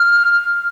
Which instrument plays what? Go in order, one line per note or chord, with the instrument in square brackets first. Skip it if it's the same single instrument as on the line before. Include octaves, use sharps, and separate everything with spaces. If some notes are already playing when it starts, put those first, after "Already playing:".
Already playing: [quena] F6